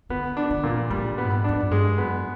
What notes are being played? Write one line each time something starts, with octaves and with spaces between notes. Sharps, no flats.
D3 B3
D4
D3
A#2
G#2
A2 G3
B3
G2
G#2
F2 D4
F#2
G2 G#3
F#2 B3